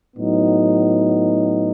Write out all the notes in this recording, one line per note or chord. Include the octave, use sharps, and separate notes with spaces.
A2 F#3 B3 D#4